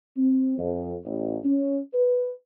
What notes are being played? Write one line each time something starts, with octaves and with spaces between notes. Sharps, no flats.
C4
F2
A1
C#4
B4